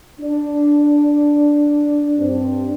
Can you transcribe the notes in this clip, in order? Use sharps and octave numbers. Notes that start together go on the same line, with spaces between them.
D4
G2 C4 D4